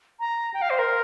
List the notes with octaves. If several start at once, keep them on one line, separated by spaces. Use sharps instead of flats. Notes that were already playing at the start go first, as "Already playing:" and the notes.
A#5
G5
F5
C5
A#4